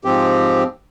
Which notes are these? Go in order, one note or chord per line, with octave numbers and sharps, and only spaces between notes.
G#2 F3 C4 G4